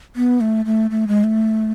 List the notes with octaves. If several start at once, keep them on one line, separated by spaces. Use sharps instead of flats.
B3
A3
A3
A3
G#3
A3